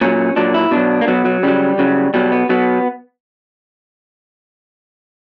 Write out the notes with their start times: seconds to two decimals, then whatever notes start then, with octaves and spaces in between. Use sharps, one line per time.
0.01 A#2 F#3 C#4
0.36 A#2 F#3 D4
0.54 E4
0.71 B2 F#3 D4
1.01 A#3
1.08 B2 F#3 B3
1.25 F#3
1.43 C#3 F#3 G3
1.79 C#3 F#3
2.14 B2 F#3 G3
2.32 B3
2.49 B2 F#3 B3